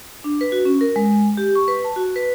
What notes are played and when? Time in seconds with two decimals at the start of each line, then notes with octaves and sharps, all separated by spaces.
0.24 D4
0.41 B4
0.52 F#4
0.65 C#4
0.81 A#4
0.96 G#3
1.37 G4
1.55 C#6
1.68 B4
1.84 A5
1.96 F#4
2.16 B4